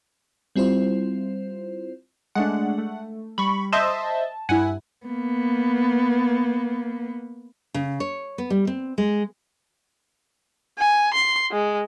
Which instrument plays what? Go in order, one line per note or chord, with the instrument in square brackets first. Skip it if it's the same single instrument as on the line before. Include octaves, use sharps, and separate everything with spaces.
[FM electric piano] G3 C4 E4 F4 C5
[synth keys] G#3 A3 D4 [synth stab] F#5
[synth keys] A3
[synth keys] G3 [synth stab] B5 C#6
[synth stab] C5 D#5 E5 [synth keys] A5
[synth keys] G2 E4 [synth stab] F#5 G#5
[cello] A#3 B3
[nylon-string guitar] C#3
C#5
B3
G3
C4
G#3
[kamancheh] G#5
C6
G#3